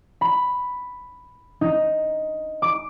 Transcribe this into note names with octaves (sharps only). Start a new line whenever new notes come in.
B5
D#4
D6